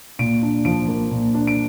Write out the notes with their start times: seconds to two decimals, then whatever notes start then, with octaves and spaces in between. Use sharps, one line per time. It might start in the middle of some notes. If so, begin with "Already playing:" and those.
0.19 A#2 D7
0.42 D4
0.65 F3 D7
0.88 A#3
1.11 A#2
1.35 D4
1.47 D7